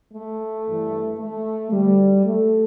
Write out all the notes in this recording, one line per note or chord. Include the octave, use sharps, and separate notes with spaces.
A3
G2 E3
A3
D2 D3 G3
A3